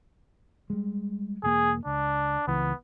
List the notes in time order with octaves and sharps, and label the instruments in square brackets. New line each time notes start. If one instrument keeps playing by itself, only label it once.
[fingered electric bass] G3 G#3
[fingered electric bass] E1 A#3 [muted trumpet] G#4
[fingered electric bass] C#2 [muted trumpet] D4
[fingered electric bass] C#2 E3 [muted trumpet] B3